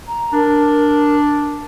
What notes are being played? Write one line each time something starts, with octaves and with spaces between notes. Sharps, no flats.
A#5
D4 A#4